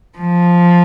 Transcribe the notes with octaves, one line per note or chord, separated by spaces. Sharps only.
F3